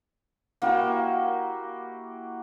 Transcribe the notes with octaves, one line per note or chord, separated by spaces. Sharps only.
A#3 E4 F#4 G4